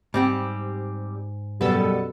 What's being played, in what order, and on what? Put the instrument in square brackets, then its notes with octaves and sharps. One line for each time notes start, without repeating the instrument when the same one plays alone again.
[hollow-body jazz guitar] G#2 [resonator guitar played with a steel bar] G3 C4 G4
[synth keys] F#2 B2 A4 [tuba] G3 [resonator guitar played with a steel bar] B3